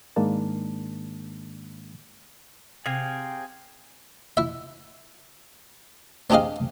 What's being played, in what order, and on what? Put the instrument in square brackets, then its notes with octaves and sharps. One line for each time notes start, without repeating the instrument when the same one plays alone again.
[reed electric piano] G#2 D#3 G#3 A#3 D4 A5
[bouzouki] C3 [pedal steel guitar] G#4 F5 G#5 [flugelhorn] G5
[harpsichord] E4 E5
C4 D4 G4 G#4 D#5 F5